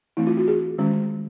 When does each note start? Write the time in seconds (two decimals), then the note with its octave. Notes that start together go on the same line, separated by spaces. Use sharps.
0.17 E3 A3 C4 E4
0.27 F4
0.37 F#4
0.48 G#4
0.78 D#3 G#3 C#4